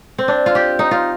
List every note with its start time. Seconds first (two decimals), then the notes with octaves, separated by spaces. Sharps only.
0.18 C4
0.28 D4
0.46 F4
0.55 G4
0.79 D#4
0.91 F4